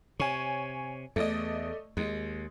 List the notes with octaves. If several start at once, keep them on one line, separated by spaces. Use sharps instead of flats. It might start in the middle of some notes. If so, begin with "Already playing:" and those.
C3 C#5 G#5
E2 A3 D5 D#5
D#2 G#3